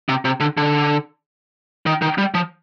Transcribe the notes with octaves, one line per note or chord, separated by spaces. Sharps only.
C3
C3
D3
D3
D#3
D#3
G3
F3